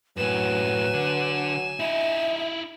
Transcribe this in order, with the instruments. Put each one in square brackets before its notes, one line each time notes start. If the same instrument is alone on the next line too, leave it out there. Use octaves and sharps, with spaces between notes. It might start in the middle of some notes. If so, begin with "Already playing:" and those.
[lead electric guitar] F#2 A2 [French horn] F#3 [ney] B4 [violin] G#5 E7
[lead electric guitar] D3
[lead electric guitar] D#4 E4 [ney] E5